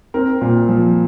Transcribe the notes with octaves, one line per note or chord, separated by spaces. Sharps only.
C4 A#4
A#2
F3